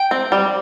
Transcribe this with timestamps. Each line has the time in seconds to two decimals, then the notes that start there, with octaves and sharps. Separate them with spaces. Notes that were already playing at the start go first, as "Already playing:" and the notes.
Already playing: G5
0.11 C4
0.32 G3